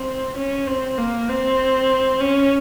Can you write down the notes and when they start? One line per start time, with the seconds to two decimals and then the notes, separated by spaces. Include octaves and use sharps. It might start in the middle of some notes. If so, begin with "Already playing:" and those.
Already playing: C4
0.37 C#4
0.67 C4
0.98 A#3
1.29 C4
2.20 C#4